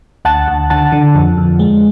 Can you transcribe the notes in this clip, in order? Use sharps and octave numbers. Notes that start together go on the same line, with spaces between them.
D2 F#5 A5
D2
D3 F#5 A5
D3
F2
F2
G#3